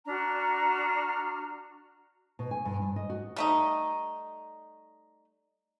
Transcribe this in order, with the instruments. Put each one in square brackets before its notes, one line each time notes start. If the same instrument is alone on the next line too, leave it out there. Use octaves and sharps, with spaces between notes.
[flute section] D4 F#4 A#5 F6
[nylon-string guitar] B2
G#5
G2
G2
D#5
F#4
[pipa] G3 A3 D#4